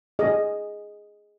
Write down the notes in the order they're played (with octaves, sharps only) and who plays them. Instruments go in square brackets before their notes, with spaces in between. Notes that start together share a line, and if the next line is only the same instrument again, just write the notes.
[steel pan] G#4 D#5